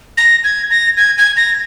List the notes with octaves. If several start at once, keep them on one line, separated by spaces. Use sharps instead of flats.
A#6
G#6
A#6
G#6
G#6
A#6